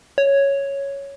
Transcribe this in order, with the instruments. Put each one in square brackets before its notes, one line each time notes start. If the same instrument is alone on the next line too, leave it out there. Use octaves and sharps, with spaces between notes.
[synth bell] C#5